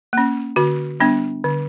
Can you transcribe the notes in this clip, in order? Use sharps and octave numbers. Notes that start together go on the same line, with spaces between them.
A#3 C#4
D3 F#4
G3 B3 D4
D3